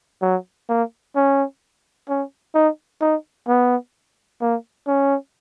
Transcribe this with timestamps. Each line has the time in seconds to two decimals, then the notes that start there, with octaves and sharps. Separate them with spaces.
0.22 F#3
0.69 A#3
1.16 C#4
2.09 C#4
2.54 D#4
3.01 D#4
3.48 B3
4.41 A#3
4.87 C#4